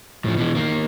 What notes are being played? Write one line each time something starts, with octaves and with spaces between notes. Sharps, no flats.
A2 F3
B2 E3
D#3 A#3